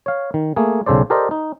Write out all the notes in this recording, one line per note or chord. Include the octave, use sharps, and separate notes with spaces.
C#5 F5
D#3
A3 A#3 G#4
B1 C#3 A4 C5 D5
G4 A4 A#4 C5 D5 D#5
D#4